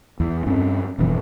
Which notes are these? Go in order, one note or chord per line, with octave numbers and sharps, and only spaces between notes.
E2
G2 C4 C#4
F1 G2 B2 E3